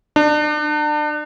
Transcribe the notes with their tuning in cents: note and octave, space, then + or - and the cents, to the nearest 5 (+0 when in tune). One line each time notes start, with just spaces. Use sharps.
D4 +35